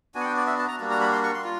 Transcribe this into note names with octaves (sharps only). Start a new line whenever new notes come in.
B3 D4 F#4 G#5
F#5
G5
D5
E5
A5
A#5
G3 A#3 D4 F#4
A#5
B5
C6
C#6
C6
F4